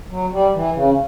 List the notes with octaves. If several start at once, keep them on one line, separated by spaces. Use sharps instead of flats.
F#3
G3
E3
C#3